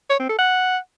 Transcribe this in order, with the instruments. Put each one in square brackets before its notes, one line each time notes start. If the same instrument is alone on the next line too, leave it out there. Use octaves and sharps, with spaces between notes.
[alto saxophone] C#5
C4
A4
F#5